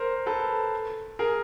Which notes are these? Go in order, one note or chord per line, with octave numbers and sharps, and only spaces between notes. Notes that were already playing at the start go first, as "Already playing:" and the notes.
Already playing: A#4 C5
A4 B4
G#4 A#4